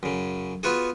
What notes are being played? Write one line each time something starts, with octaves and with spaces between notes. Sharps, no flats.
F#2 C#3
B3 F4 F#4 G#4